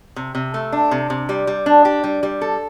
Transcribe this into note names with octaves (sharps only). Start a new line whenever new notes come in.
C3
C3
A3
D4
C3
C3
G3
G3
D4
G4
G3
G3
A4